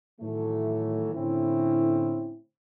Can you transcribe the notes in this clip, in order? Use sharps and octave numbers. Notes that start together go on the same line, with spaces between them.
A2 D#3 E3 F#3 A3
A2 D3 C4 C#4 E4